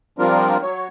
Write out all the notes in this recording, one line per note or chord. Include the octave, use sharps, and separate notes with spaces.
F3 G3 C4 D4 F4 A#4
F#3 C#5